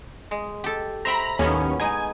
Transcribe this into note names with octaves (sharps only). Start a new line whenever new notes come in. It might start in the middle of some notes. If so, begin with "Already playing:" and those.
G#3
G4 A4
C5 E5 G5 A#5 B5
D#2 A2 F#3 B3 C#4
G#3 D#4 G#5